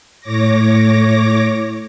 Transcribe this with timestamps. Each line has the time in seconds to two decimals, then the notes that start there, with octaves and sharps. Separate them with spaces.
0.21 A2 C#5 D6 A#6